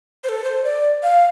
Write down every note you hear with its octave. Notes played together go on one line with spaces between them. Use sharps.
C5
A4
C5
D5
F5